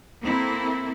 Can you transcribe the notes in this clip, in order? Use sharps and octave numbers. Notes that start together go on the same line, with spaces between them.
A#3 C4 E4 A4